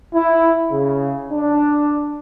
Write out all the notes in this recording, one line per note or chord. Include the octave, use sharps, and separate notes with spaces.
E4
C#3
D4